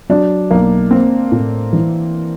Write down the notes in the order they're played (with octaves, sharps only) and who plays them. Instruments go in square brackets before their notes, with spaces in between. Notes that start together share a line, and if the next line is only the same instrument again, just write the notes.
[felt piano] F#3 [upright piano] D4
[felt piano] B1 [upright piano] A#3
[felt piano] A#3 [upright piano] C4
[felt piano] A2
E3